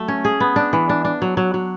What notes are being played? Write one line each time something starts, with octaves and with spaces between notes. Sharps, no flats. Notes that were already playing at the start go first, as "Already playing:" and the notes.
Already playing: F#3 A3
C#4
G#4
B3
D4
E3
D4
D4
F#3
F#3
F#3